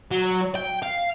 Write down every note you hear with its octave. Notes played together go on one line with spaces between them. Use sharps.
F#3
G5
F5